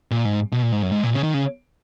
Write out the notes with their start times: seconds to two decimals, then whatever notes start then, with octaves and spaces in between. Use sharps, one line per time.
0.11 A#2
0.25 G#2
0.52 B2
0.62 A#2
0.72 G#2
0.82 F#2
0.92 G#2
1.03 A#2
1.13 C#3
1.24 D#3
1.34 C#3